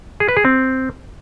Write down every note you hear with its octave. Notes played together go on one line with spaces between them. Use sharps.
G#4
B4
G#4
C4